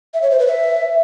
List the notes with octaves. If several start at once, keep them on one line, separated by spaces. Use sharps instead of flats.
E5
C#5
C5
B4
E5